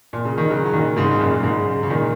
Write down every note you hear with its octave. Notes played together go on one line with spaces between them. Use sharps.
A#2
C#3
D#3
C#3 F#3
F#3
A#2 D#3
G#2 C#3
C#3
F#2 A#2
G#2 C#3
C#3
A#2 D#3